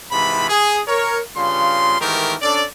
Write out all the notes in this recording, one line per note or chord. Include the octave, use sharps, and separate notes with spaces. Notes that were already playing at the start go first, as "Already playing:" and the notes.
G#2 C3 E3 F3 B5
G#4
A#4 C#5
G2 C#3 F4 C6
G#2 D#3 E3 A3 G4 A#4
C#4 D4 A4 D5